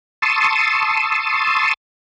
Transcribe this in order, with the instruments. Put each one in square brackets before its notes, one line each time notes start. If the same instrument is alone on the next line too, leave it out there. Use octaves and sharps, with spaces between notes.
[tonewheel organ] A5 C6 C#6 D#6 E6